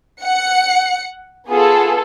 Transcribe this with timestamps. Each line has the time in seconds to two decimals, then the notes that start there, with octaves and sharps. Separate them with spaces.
0.21 F#5 C#7
1.49 B3 F4 G#4 A4